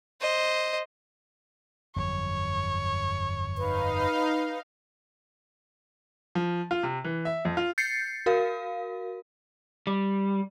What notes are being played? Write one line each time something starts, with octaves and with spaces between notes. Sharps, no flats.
C5 D#5
G1 F2 F#3 C#5
D#4 B4 F5
F3
F4
C3
E3
E5
F2
F4
G6 A6 C7 C#7
F#4 A#4 F5
G3